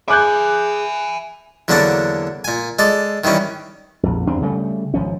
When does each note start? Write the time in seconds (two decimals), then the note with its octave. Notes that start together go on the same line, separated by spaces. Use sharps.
0.08 G#4 E5 G#5 D6 F#6 G6
1.68 E2 D3 F#3 A#3 D4 A5
2.44 A#2 G#5
2.79 G#3 A4 D5
3.24 D#3 E3 G3 C#4
4.03 A#1 F2
4.27 E2 G2 C4 D4
4.41 C#3 G3 A3
4.94 G#1 F3 C#4